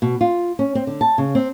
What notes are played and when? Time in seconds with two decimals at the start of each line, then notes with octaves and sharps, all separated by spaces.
0.02 B2
0.21 F4
0.59 C#4
0.75 C4
0.87 D3
1.01 A5
1.18 C#3
1.35 C4